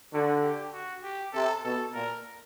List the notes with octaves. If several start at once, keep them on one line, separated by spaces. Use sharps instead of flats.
D3 F#4
G4
F#4
G4
C3 A4
B2 A4
A#2 A#4